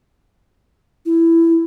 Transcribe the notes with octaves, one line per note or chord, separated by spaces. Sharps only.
E4